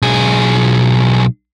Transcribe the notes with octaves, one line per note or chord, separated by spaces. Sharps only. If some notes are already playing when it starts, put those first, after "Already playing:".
B1 G#4